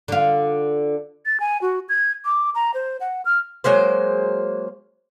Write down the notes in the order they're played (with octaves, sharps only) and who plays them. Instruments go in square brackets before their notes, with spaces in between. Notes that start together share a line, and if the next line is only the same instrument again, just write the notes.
[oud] D3 F4
[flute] A6
G#5
F#4
G#6
D6
A#5
C5
F#5
F6
[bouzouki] F#3 G#3 A#3 C5